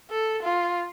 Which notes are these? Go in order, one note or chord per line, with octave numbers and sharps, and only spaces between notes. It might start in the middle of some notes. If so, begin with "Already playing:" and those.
A4
F4